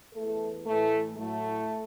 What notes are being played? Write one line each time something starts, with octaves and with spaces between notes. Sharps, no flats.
E2 E3 A3 A4
A2 E3 A3
A2 F#3 A3